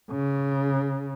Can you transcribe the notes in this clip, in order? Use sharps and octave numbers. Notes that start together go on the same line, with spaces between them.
C#3